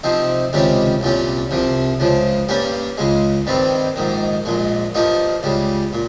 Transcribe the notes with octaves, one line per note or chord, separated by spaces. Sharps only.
C3 F3 C4 D#4
C#2 C3 D#3 G3 C#4
C2 A#2 G3 C#4
C2 C3 F3
C#2 C#3 F3
G2 G3 A#3 C#4
C#2 C#3 G#3
G2 D#3 G3 C4
A#1 G#2 D#3
A#1 A#2 G#3
G2 F3 A#3 D#4
C#2 C#3 G3
A#2